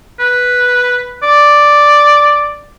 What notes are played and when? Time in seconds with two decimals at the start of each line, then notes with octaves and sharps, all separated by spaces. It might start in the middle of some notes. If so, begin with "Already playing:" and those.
0.20 B4
1.23 D5